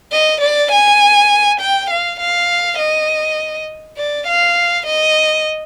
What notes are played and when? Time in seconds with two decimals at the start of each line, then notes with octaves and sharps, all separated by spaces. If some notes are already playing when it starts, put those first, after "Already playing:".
0.12 D#5
0.41 D5
0.72 G#5
1.60 G5
1.90 F5
2.20 F5
2.78 D#5
3.97 D5
4.27 F5
4.87 D#5